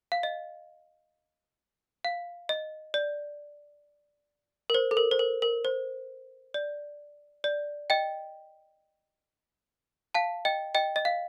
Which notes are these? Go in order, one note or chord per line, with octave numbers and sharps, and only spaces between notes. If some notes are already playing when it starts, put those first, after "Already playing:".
F5
D#5
F5
D#5
D5
A#4
C5
A4
A#4
C5
A#4
A#4
C5
D5
D5
D#5 G5
F5 A5
D#5 G5
D#5 G5
D#5
F5